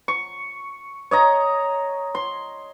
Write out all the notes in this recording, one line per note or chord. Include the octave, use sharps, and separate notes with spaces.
C#6
C#5 D#5 A#5
C6